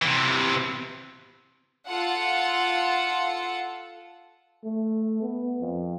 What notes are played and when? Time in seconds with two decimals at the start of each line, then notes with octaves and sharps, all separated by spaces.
0.02 C3 E3
1.87 F4 A4 F#5
4.64 A3
5.22 B3
5.61 F2